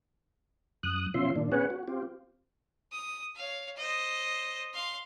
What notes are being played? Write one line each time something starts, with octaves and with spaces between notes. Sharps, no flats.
F#2 D#6 F#6
B2 F3 C#4 F4 E5 C6
A#2 D#3 D4
B3 C#4 G#4 B4 C#5 F#5
F#4
C4 F4 G4
D#6
C#5 F5
C5 D#5
F5 C6